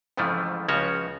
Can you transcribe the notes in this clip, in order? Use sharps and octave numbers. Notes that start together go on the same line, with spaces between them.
F2 G#2 C#3 E3 F3 A3
C#2 C#3 F3 C#4 F#4 C#5